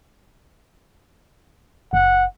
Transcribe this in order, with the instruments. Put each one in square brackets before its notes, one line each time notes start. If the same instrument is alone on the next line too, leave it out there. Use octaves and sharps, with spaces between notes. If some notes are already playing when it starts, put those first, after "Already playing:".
[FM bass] F#1 [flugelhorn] F#5